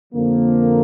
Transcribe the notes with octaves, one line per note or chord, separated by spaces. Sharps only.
F2 D3 F3 A#3